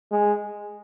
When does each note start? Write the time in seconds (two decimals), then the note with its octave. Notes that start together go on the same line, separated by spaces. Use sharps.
0.12 G#3